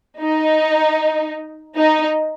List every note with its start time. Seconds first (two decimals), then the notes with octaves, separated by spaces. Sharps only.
0.22 D#4
1.77 D#4